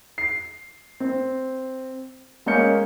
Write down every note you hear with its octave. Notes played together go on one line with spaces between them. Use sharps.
C7
C4
G#3 A#3 C#4 G6 C#7